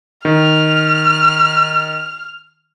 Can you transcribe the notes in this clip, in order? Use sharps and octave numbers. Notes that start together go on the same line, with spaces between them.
D#3 F6